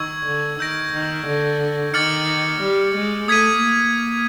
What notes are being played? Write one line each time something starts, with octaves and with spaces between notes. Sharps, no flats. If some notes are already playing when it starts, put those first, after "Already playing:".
Already playing: D#3 C#6 E6 G#6
D3
D#3 E6 G6 A#6 D7
D#3
D3
D#3 D6 F6 A6 C#7 F#7
G3
G#3
A3 D#6 G#6 B6 D#7
A#3